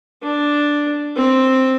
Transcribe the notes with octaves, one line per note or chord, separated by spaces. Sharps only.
D4
C4